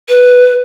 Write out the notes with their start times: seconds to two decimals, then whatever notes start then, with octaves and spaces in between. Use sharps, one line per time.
0.09 B4